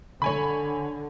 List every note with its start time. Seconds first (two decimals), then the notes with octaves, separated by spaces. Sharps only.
0.22 D3 C#5 G#5 B5